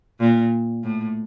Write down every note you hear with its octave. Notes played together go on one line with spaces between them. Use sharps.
A#2
A2